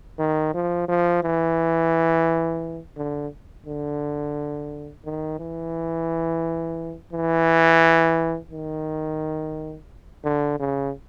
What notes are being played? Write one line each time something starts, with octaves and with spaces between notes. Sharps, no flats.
D#3
F3
F3
E3
D3
D3
D#3
E3
E3
D#3
D3
C#3